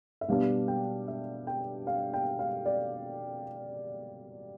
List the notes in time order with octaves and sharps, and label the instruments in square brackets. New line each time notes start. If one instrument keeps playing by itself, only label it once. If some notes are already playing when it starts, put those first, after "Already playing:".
[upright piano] E5
B2 G3 B3 D4 F5
G5
E5
G5
F5
G5
F5
D5